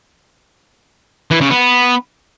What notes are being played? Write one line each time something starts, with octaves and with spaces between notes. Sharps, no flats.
E3
C#3
B3